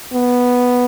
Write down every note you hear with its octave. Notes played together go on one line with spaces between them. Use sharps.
B3